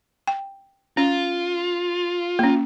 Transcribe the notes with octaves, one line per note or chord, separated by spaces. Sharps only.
G5
C#4 F4
A#3 C#4